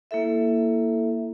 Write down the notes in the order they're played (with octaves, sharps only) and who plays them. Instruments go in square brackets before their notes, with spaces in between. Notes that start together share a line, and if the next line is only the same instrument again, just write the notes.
[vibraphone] A#3 E4 A4 E5